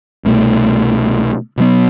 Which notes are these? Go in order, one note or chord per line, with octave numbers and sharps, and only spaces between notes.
C2 B2 A3
B2 F#3 B3